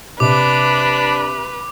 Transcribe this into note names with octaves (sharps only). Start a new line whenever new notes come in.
C3 D4 B4 D6